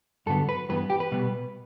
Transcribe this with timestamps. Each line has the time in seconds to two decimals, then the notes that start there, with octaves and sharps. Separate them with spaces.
0.26 G2 D3 F#3 B3 A4
0.49 B4
0.69 G2 E3 B3 B4
0.90 G4
1.00 B4
1.12 B2 G3 B3